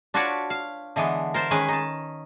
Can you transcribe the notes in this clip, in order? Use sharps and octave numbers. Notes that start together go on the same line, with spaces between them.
D4 F4 F#4 B4 C#5 D5
F5
D3 E3 G#3 B3
A#4 C5 A5
D#3 G#3 C#4 G#4 B4
D#4 A5